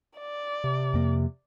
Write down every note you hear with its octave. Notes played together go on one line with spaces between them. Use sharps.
D5
C3
F2 A#3